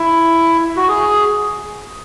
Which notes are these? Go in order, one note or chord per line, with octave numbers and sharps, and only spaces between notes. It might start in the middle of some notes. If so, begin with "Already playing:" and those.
Already playing: E4
F#4
G#4